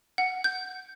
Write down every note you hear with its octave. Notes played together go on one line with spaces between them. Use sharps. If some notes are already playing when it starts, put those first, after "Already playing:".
F#5
G6